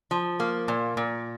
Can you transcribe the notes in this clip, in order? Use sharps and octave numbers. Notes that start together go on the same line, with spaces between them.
F3
A#3
A#2
A#2